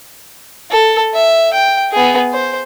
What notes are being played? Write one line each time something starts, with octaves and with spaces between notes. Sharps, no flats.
A4
E5
G5
B3 G#4
C5